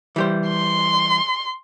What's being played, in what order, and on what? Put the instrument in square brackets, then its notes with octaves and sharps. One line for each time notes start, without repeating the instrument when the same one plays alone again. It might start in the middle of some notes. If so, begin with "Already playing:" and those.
[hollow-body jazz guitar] E3 G3 C5
[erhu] C6